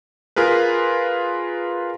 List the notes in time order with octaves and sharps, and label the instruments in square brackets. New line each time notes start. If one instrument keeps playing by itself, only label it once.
[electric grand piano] F4 G#4 A#4 B4